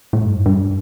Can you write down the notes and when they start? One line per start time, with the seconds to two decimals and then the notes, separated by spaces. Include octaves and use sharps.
0.13 A2
0.24 G2
0.36 F#2
0.46 G2